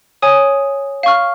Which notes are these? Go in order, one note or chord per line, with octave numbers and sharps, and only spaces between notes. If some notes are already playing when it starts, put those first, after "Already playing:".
C#5 G#5 D#6
F5 C#6 F6